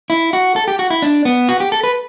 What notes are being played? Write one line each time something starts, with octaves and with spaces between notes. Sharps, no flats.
E4
F#4
A4
G4
F#4
E4
D4
B3
F#4
G4
A4
B4